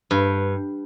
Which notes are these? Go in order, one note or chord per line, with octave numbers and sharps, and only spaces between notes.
G2